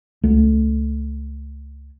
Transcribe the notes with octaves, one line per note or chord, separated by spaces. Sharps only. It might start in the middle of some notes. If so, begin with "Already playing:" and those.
C#2 A3